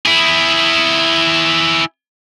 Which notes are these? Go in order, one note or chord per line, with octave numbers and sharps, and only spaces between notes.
E4 G#4